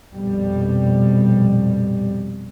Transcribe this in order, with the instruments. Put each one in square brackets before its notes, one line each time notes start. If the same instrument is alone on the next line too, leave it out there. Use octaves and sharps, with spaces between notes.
[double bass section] A#1 F2 B2 G3